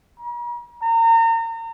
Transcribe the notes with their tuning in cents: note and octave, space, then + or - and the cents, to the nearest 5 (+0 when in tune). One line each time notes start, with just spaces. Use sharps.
A#5 +45
A#5 -35